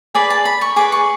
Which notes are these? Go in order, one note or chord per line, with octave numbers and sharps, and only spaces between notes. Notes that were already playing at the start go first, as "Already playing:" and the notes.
G#4 B4 D5 B5
A5
B5
C#6
G#4 B4 D5 D6
C#6